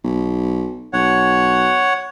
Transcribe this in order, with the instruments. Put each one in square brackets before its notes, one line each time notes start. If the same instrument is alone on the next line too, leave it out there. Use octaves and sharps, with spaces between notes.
[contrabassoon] B1
[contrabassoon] B1 [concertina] C#5 F#5